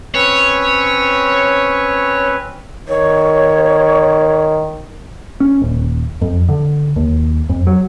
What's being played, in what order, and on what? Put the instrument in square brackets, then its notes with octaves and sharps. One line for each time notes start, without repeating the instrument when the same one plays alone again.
[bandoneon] C4 C#4 B4 [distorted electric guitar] C#5
[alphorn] D#3 [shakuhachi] C#5
[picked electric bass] C#4
D#1
F2
D3
D#2
F2
F#3